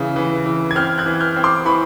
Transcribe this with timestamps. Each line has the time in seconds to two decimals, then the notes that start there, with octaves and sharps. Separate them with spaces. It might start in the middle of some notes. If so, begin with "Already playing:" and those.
Already playing: C#3 E3
0.16 E3
0.46 E3
0.71 G#6
0.75 C4 F6 G6
0.98 F#6 G#6
1.06 E3
1.20 F6 G6
1.36 C4
1.44 C6 D6
1.65 E3 B5 C#6